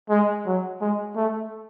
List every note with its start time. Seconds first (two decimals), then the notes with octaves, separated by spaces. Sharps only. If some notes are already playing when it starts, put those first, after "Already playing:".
0.10 G#3
0.46 F#3
0.81 G#3
1.16 A3